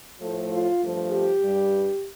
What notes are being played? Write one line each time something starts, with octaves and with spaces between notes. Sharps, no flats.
A2 F3 A3
F4
G2 F3 A3
G4
G2 G3